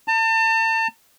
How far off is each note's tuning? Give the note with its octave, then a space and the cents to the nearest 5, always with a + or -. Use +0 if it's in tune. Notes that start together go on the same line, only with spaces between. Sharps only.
A5 +35